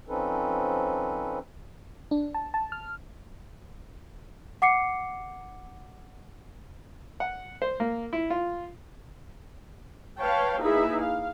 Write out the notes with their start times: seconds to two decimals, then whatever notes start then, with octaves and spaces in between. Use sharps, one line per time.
0.08 F3 C4 C#4 D#4 A4 B4
2.11 D4
2.34 A5
2.54 A5
2.72 F6
4.62 F#5 D6 C7 C#7
7.20 F#5
7.62 C5
7.80 A#3
8.13 E4
8.30 F4
10.18 B4 C#5 F5 G5 A5
10.60 A#3 D#4 E4 G#4 B4 E5
11.00 F5